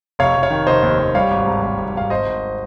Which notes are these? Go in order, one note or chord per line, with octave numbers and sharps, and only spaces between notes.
F1 C#5 F5
F1
C#5 F5
D#3
F1 C5 D#5
D#2
D#2
G3 C#5 F5
G#1
G#1
G#1
G#1
G#1 F5
G#1 C5 D#5
G#1